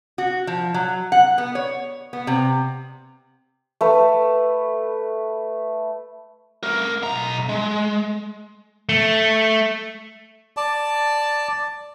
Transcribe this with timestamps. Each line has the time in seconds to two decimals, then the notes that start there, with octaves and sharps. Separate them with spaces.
0.18 F#4
0.47 F3
0.74 F#3
1.12 F#5
1.38 B3
1.55 C#5
2.13 B3
2.27 C3
3.81 A3 B4
6.63 A3 A#4
7.03 B1 A#5
7.49 G#3
8.89 A3
10.57 D5 A5